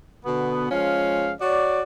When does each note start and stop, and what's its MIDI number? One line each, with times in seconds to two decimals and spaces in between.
0.24 0.66 47
0.24 0.66 50
0.24 0.66 59
0.71 1.32 53
0.71 1.32 56
0.71 1.32 61
0.71 1.32 77
1.40 1.83 66
1.40 1.83 73
1.40 1.83 74